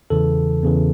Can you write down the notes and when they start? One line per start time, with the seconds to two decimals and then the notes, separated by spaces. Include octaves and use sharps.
0.10 E2 C#3 E3 A4
0.62 E2 C#3 E3